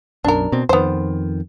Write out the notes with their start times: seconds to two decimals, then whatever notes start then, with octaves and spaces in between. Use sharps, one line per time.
0.24 B1 F#2 D4 A#4
0.52 B2 C4
0.69 F2 D#3 B3 C5